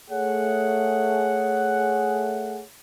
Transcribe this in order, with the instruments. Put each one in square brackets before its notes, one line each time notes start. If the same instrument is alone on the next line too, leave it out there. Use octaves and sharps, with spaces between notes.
[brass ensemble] A3 G#4 C#5 F#5